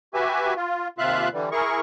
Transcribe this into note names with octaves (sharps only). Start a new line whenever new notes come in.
F#4 G4 B4 E5 G#5
F4
D#2 C3 F4 E5 F5 F#6
D3 E3 G3
E4 G#4 A#4 C#6